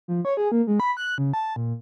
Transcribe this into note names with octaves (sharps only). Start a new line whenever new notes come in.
F3
C#5
G#4
A#3
G#3
B5
F#6
C#3
A5
A#2